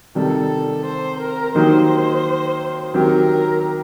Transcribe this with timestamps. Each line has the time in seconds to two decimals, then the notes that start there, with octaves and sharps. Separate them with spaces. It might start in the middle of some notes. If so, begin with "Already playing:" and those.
0.15 C3 D#3 G3 A4
0.85 C5
1.20 A#4
1.55 D#3 F#3 A#3 D#4 G4 C5
2.94 D#3 F#3 C4 G4 A#4